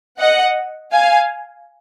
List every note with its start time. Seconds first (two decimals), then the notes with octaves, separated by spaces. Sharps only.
0.19 D#5 F#5
0.92 F5 G#5